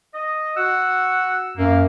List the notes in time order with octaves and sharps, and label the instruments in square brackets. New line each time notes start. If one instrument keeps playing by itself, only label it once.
[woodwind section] D#5
[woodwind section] F#4 F#5 [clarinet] E6
[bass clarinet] F#2 [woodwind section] A#3